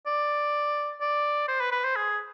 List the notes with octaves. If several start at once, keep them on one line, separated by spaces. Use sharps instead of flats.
D5
D5
C5
B4
B4
C5
G#4